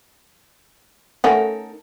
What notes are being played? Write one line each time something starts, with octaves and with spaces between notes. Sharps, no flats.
A3 C#4 D#4 A4 A#4 F#5